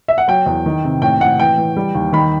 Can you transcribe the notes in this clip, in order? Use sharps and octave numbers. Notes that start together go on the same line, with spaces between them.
E5
F#5
F#3 G5
E2
D#3
C3
A2 G5
A2 F#5
E3 G5
E3
G3
D#2
D#3 B5